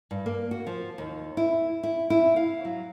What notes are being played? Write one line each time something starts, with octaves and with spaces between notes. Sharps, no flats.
G2
A#3
F#4
F3
D#2
E4
E4
E4
F5
F#3